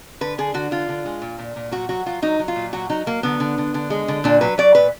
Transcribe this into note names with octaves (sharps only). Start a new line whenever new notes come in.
D3 B4
D3 G#4
D3 F#4
D3 F4
D3
G#3
A#2
A#2
A#2
F#3 F#4
F#3 F#4
F#3 F4
F#3 D#4
F#3
F4
A#2
F#3 F#4
F#3 D#4
F#3 A#3
D3 B3
D3
D3
D3
G#3
D3
A#2 D4
F#3 B4
F#3 D5
A#2 B4